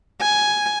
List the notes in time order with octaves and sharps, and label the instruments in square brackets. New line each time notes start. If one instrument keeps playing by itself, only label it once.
[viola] G#5